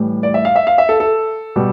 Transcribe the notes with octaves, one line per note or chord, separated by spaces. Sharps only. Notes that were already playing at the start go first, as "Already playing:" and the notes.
Already playing: A2 E3 G3
D5
E5
F5
E5
F5
E5
A4
A4
B2 G3